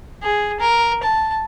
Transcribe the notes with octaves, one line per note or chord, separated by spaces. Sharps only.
G#4
A#4
A5